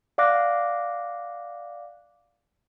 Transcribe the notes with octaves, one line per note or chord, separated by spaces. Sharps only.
D5 F5 F#5 D6 F#6 A#6